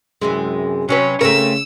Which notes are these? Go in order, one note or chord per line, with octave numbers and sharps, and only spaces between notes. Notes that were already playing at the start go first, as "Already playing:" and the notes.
F#2 C3 E3 G#3
C3 F#3 C#4 B4
C#3 A3 C4 A#4 E6